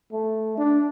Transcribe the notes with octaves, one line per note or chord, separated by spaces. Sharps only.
A3
D4